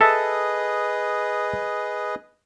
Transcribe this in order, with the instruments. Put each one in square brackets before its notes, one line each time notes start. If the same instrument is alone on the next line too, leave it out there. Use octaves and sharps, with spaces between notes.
[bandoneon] G#4 B4 D#5 [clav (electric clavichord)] A4 E5 A5